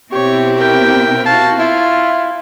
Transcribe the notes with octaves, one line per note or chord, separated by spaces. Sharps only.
B2 C4 E4 G4 C#5
A#4 G5
F#4 F5 A5
E4 F4